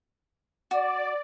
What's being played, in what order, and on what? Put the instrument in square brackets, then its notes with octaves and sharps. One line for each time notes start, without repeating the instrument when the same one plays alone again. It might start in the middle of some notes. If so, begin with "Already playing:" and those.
[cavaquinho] F#4 [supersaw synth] D5